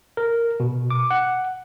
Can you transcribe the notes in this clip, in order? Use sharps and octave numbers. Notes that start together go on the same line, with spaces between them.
A#4
B2
D6
F#5